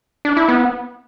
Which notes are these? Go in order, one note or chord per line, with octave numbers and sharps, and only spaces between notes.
D4
E4
B3